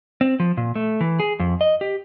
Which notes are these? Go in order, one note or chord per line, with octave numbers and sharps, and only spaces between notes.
C4
F3
A#2
A3
E3
G#4
F2
D#5
G4